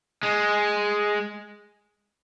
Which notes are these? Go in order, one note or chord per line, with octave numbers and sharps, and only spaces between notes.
G#3